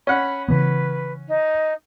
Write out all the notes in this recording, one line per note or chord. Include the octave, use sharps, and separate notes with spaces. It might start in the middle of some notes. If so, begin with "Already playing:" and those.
C#4 F#5 B5
C#3 E3 B3 B4
D#4